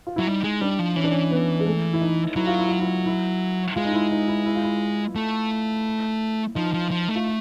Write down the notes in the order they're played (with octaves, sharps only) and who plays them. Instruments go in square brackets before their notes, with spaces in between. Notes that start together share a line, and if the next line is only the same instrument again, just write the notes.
[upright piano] F4
[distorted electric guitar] F#3 [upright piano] E4
[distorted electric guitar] G3 [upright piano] D#4
[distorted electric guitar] G#3
[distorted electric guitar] G3 [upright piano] D4
[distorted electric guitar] F3
[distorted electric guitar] E3 [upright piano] C#4
[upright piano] D4
C#4
B3
G#3
A3
E4
D#4
[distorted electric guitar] F#3 [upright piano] E4
[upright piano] F4
E4
F4
E4
E4
[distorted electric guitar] G#3 [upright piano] F4
[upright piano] D#4
E4
D#4
E4
E4
F4
E4
[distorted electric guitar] A3
[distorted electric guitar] F3 [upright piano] D#4
[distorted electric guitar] F3
F3
A3
[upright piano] F4